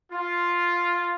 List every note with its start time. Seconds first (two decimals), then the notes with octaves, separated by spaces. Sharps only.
0.12 F4